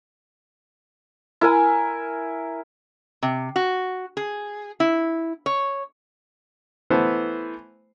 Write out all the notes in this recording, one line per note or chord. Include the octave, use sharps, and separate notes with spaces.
E4 A#4 G#5
C3
F#4
G#4
E4
C#5
E3 A3 B3 C5